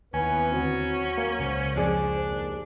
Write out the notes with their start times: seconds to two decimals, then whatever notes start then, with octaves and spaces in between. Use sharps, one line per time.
0.14 D#2 E3 B3 C#4 B4 G#5
0.52 D2 F#3 C4 F#4
1.18 A#3
1.40 C#2 C#3 C5
1.76 F2 D4 G#4 D5
2.16 D#2